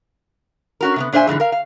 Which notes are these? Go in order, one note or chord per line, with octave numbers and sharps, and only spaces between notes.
C#4 F#4 A#4
C3 A#3 B3
A#2 D4 C5 E5 G#5
F2 G#2 D3 E3
A#4 F5
F5